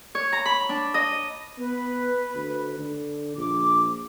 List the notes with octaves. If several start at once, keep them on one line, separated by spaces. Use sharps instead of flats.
C#5
A#5
B5
D4
D#5
B3 B4
D2
D3
A#1 D6